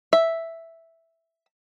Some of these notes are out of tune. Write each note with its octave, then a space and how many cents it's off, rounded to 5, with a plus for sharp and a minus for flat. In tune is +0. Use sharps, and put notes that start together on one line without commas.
E5 +0